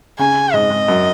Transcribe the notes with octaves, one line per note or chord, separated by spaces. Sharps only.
C#3 G#5
G#2 D#5
G#2
F#2